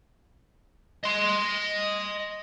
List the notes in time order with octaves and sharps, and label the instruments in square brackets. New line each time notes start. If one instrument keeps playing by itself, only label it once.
[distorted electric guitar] D#5 C6